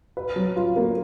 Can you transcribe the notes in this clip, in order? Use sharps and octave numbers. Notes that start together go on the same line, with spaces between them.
B4
F#3
F4
A#3